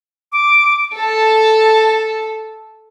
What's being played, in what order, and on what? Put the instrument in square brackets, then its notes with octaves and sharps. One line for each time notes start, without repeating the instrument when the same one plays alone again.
[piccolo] D6
[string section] A4 [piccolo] A5